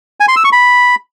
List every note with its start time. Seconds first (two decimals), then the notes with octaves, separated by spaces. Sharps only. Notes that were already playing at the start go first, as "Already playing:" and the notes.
0.20 G#5
0.28 C6
0.36 E6
0.44 C#6
0.52 B5